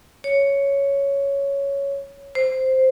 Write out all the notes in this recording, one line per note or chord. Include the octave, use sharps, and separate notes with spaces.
C#5
C5